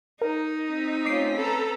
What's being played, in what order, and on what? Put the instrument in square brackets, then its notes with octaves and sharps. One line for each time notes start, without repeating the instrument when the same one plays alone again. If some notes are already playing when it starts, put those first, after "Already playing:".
[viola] D#4 [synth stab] A#4
[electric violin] C4 B6
[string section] A3 C#4 F4 [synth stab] D6 D#6 C7
[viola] A4 [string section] B4 A#5